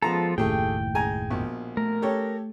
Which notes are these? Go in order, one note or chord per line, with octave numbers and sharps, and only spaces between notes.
F3 G#3 B3 F4 A4 A#5
F#1 D#2 A2 A3 G4 G#4 G5
G#3 G#5 A#5
A#1 B2
A3 A#4
G4 A4 C#5